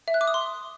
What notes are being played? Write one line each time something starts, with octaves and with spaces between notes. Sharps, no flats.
E5
F#6
D6
D#6
C6